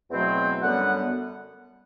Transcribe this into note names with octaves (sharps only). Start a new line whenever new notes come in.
E2 B2 F#3 A3 C4
F#2 D3 G3 B3 F#5